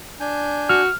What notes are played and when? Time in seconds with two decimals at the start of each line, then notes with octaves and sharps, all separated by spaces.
0.20 D4 G#5 G6
0.70 F#4 F6